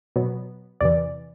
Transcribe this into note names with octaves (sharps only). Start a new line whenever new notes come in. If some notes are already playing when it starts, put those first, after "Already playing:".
B2 F#3 B3
E2 C3 E3 D5